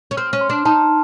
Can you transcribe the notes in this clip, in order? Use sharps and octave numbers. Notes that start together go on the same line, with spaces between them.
C#4
C4 F6
C#4
C6
D4
D#4 A5